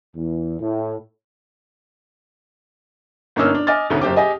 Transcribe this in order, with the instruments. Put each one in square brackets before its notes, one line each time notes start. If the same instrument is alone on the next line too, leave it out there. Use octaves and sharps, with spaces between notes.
[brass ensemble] E2
A2
[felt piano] G1 A#3 C#4 D#4 E6 F6
D4
D#5 G#5 D6 F6 A6
D2 G#2 B2 A3 B3 C#4
F#1 G4 C5 G5 D6
G4 G#4 D#5 G#5